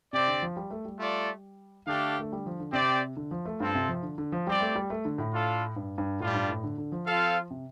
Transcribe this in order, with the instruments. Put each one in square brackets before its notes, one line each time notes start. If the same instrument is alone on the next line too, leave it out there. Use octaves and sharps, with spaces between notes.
[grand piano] C3 [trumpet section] C4 G4 D5
[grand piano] D3
F3
G3
A3
G3
[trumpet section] A3 F4 A4 D5
[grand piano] D3 [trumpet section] A3 D4 G4 F5
[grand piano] A3
G3
F3
D3
[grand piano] C3 [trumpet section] C4 G4 D5
[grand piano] D3
F3
A3
[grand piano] G2 [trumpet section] C4 F4 A4
[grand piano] C3
F3
D3
D3
F3
[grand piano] G3 [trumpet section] C4 G4 D5
[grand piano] A3
G3
A3
D3
A2
[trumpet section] D4 F4 A4 F5
[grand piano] G2
G2
[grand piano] A2 [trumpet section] G3 D4 F4
[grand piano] G2
A2
D3
D3
F3
[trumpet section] C4 F4 A4 F5
[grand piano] C3